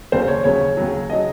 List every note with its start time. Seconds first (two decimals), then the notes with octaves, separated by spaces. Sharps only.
0.12 D#2 C#3 F#3 C5
0.28 C#5
0.44 D#2 C#3 F#3 C#5
0.77 D#2 C#3 F#3
1.10 C#3 F#3 D#5